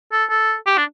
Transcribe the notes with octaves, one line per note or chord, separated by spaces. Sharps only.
A4
A4
G4
D4